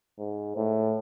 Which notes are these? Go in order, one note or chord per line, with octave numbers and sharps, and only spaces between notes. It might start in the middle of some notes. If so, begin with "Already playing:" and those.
G#2
A2